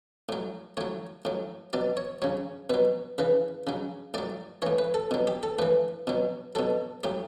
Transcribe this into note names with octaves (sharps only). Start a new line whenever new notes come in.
A2 F#3
A2 F#3 C#5
A2 F#3
B2 F#3 D5
C#5
C#3 F#3 C#5
B2 F#3 B4
C#3 E3 B4
C#3 F#3
A2 F#3 D5
A2 E3 C#5
B4
A4
B2 F#3
G4
A4
A2 E3 B4
B2 F#3
B2 F#3 A4
A2 F#3 G4